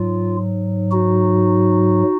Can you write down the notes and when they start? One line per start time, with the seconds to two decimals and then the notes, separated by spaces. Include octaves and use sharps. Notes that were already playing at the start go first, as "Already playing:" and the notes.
Already playing: G#2 F#3 F4
0.92 D#4 F#4